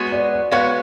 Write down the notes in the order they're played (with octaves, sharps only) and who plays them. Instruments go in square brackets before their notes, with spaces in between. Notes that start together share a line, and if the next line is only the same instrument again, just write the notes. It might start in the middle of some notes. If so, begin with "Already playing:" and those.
Already playing: [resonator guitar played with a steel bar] G#3 B3 F#4 C#5
[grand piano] D5
D5
[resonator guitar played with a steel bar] G#3 B3 F#4 C#5 [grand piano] F5